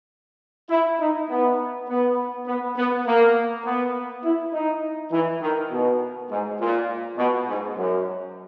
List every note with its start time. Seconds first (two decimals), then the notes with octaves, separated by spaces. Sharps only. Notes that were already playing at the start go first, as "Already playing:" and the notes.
0.70 E4
1.00 D#4
1.30 B3
1.89 B3
2.47 B3
2.77 B3
3.06 A#3
3.65 B3
4.23 E4
4.53 D#4
5.12 E3
5.41 D#3
5.71 B2
6.30 G#2
6.60 A#2
7.17 B2
7.48 G#2
7.77 F#2